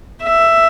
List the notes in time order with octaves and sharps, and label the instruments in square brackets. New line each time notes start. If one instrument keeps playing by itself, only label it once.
[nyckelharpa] E5